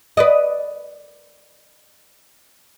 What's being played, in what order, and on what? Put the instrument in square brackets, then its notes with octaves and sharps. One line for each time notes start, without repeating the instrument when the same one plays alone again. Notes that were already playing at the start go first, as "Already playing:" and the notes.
[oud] B4 D5 D#5